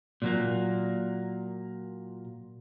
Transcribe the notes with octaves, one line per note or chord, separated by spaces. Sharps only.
A#2 F#3 A#3